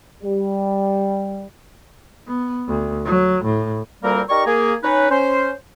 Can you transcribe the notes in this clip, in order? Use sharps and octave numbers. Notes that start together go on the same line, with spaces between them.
G3
B3
D2
F#3
A2
D2 A#2 G3 A#3 C4 A#4
D#4 G4 A#4 D5 A#5 C#6
A#3 G#4
C#4 D#4 B4
C#4 C5